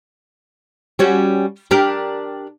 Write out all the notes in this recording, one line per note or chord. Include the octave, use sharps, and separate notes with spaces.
G3 C#4 F#4
D4 G4 A#4